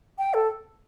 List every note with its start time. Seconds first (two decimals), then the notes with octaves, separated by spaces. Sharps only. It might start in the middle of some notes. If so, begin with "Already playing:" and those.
0.18 G5
0.34 A4